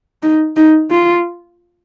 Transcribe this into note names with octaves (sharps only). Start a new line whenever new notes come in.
D#4
D#4
F4